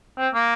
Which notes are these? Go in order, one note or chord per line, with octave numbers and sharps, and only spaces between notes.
C4
A#3